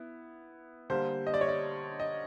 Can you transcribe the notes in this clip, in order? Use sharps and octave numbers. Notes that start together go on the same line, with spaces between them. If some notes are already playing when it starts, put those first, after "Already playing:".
Already playing: B3 E4
D3 G3 A#3 C5
D#5
D5
C#5
D5
D#5